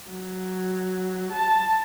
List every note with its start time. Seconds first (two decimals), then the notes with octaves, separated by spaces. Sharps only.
0.10 F#3
1.32 A5